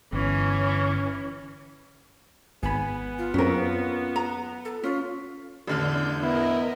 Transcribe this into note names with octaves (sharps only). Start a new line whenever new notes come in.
G1 E3 C#4
G#1 B3 G#5 B5
F4
F#2 C4 C#4 A#4
A#5
A4
C#4 F4
A1 E2 D3 D4 F6 G6
B3 E4 A#4 D#5